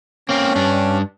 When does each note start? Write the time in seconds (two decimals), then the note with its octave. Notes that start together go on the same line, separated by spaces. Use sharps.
0.29 A#3 C4 C#4
0.55 G2 D4